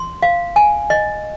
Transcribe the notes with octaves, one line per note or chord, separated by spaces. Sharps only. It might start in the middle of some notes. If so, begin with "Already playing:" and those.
Already playing: C6
F5
G#5
D#5